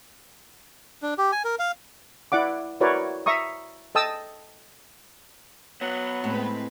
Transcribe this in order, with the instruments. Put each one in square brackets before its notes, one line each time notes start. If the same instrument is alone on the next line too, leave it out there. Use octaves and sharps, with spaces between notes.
[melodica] D4
G4
G#5
A#4
F5
[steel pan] E4 D5 F#5 D6
E4 F#4 A#4 B4 C#5 D5
E5 A#5 C#6 D#6
A4 D#5 G5 A5 D#6 E6
[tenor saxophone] F#3 [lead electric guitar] B3
[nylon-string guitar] A2 [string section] G#3 C4 B4